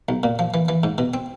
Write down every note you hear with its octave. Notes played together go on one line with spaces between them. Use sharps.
B1
A#2
F3
E3
E3
G#2
B2
C4